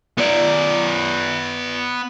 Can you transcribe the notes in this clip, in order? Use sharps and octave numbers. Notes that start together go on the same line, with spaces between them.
B3 D5